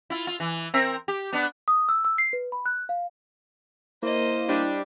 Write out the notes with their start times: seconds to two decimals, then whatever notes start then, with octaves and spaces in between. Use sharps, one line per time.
0.10 E4 F4
0.27 F4
0.40 E3
0.74 C4 A#4 E5
1.08 G4
1.32 B3 D4
1.68 D#6
1.89 E6
2.05 E6
2.18 C7
2.33 B4
2.52 B5
2.66 F#6
2.89 F5
4.03 A#3 E4 C5 D#5
4.48 G3 D4